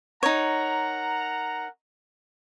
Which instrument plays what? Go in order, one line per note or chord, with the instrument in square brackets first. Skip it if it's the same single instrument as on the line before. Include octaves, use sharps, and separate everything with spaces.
[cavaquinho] D#4 C#5 [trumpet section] A#4 F#5 A#5